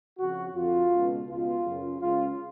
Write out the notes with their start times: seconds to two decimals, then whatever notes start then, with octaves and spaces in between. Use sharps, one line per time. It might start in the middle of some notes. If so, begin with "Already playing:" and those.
0.18 F2 C#3 F#4
0.54 F2 D3 F4
0.92 C#2 B2
1.28 C#2 B2 F4
1.64 F#2 C#3
2.00 C#2 C#3 F4